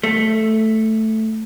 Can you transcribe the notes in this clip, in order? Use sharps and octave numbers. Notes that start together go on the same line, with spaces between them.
A3